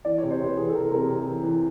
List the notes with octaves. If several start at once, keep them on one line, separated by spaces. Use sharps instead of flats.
E3 D5
C#5
C3
C5
C3 B4
E3 G#4
A4
E3 A#4
C3 A#4
C3
E3
E3